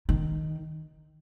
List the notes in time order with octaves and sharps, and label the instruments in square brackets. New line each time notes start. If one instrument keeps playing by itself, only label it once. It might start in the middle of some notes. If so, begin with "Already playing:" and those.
[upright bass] D#3